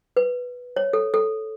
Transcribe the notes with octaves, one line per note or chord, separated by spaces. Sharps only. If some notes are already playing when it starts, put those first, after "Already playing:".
B4
C#5
A4
A4